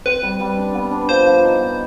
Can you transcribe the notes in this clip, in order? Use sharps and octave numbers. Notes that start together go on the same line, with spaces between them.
C4 B4
G3
G3
D4
B3
D4
F3 C5
F3
D#4
B3